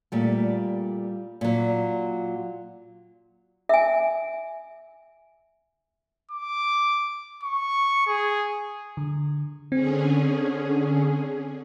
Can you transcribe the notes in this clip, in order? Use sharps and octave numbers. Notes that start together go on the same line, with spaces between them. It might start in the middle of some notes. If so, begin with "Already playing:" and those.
A#2 G3 A3
A#2 F#3
E5 G#5
D6
C#6
G#4
D3
D3 C4 C#4 G#4